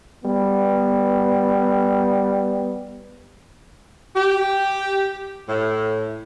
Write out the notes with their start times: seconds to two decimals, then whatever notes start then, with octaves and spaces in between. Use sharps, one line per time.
0.24 G3 B3
4.16 G4
5.48 A2